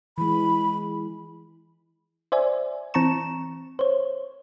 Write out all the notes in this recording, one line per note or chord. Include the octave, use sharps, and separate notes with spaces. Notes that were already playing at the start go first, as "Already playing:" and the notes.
E3 G#3 B5
C5 D5 E5 G#5
E3 C4 A5 A#5 C#6 E7
C5 C#5